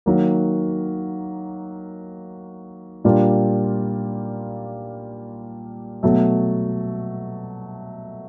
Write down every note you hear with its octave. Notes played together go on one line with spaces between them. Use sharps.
D#3 F#3 A#3
A#2 G3 A#3 D4 F4
B2 F#3 A3